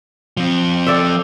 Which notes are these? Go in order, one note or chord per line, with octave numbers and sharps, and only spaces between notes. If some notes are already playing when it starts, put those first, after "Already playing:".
F3 C4
A4 D5 E5